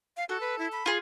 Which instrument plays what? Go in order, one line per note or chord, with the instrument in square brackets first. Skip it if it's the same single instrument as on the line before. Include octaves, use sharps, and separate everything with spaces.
[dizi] F5
[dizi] F#4 [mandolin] A4
[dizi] B4
E4
B5
[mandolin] F4 G#4